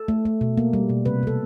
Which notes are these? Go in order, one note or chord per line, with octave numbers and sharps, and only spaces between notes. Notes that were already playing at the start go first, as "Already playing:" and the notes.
Already playing: A4
A3
A3
B2
A#3
G3
B2
C3 B4
C3 A4